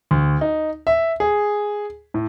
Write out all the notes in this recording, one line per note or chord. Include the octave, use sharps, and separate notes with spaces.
D2
D#4
E5
G#4
A2